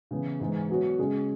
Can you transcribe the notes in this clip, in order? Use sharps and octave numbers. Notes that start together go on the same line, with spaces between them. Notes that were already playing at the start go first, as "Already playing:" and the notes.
C#3 E3 B3
G#2 E3 G#3
F#3 B3 F#4 C#5
C#3 G#3 C#4 G#4